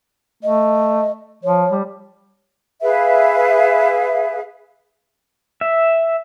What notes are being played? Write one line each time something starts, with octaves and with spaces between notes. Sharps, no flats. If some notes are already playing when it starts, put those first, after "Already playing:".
A3 D#5
F3 C#5
G3
G#4 B4 E5 F5
E5